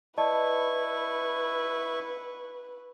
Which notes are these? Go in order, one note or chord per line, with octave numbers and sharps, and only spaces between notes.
E4 B4 D5 D#5 A5 C#6